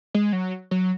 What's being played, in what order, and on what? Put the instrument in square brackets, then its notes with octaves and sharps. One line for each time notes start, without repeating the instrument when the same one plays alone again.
[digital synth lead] G#3
F#3
F#3